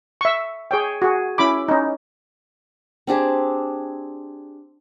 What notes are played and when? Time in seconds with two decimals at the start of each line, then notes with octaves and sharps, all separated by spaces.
0.21 E5 C#6
0.71 G#4 C#5 G5
1.02 F#4 G#4
1.38 C#4 E4 B5 D6
1.68 C#4 D#4
3.07 C4 D4 G4 G#4